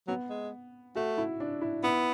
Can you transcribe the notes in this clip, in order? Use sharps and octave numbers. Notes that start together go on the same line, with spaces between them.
F#3 B3
G#3
A3 F#4
E4
D4
E4
B3 E4